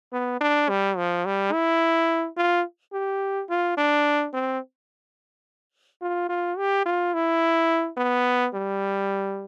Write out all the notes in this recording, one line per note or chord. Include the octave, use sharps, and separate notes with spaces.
B3
D4
G3
F3
G3
E4
F4
G4
F4
D4
C4
F4
F4
G4
F4
E4
B3
G3